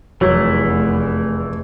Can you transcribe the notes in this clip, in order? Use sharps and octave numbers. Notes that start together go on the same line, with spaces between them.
F1 E2 E3 F#3 A3 E4